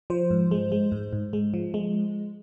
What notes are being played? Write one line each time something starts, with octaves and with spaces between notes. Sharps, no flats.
F3 C5
G#2
G#3
G#3
G#2
G#2
G#3
F3
G#3